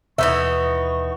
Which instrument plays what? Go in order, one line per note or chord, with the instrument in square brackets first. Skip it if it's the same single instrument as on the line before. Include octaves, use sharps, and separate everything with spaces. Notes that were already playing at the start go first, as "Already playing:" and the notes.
[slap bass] D#2 B2 [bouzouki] E3 B3 D#4 [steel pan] E5 [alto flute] C#6